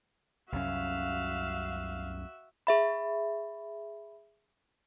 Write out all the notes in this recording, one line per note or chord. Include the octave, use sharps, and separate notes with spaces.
C2 F#2 C#4 F#4 E5 F5
G#4 E5 B5